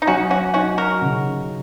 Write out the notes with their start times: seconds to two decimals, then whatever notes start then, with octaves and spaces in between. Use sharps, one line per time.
0.02 D#4
0.07 F#3 C#4 F#4
0.30 C#4 F#4
0.54 C#4 D#4 F#4
0.78 F#4 A#4
1.01 C#3